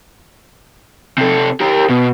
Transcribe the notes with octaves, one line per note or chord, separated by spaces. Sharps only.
C3 A4
G4 A#4
B2